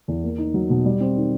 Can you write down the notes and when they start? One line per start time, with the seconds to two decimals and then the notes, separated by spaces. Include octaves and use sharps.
0.08 E2
0.24 A#3
0.38 D#4
0.54 F#3
0.70 B2
0.85 G3
1.00 C4
1.17 D#3